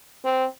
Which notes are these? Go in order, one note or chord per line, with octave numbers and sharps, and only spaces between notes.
C4